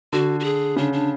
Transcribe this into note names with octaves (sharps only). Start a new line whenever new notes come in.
D3 F#4
F#4
G#4
C#3 D4
D4